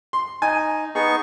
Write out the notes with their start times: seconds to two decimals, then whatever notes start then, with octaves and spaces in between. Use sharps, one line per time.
0.13 C6
0.42 D#4 G#5
0.95 B3 D#4 G#4 C#6